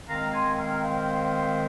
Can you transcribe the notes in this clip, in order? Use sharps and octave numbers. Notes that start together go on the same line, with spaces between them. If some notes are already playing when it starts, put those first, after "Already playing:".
D#3 G#3 C4 F5 A#5
G#5 C6
F5 A#5
C5 F5